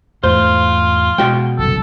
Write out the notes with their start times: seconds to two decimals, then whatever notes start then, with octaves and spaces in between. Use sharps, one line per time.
0.23 E2 G#2 A3 F4 C5
1.18 B2 G#3 F#4 G5
1.59 G1 C2 F#2 A4